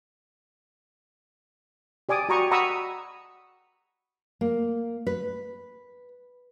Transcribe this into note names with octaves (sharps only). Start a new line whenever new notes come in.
G4 D5 G#5 D6 D#6
F#4 G5 A#5 B5 C#6 D#6
F#5 A#5 B5 C#6 D#6 E6
A#3
B4